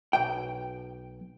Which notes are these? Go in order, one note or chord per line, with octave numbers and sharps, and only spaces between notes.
B1 G5